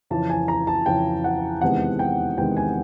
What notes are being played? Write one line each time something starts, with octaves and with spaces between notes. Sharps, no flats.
F2 C#3 E3 A5
G#5
A#5
A5
F2 C#3 E3 G5
F#5
E2 C3 D#3 G#3 B3 F#5
G5
E2 C3 D#3 G#3 B3 G5
G#5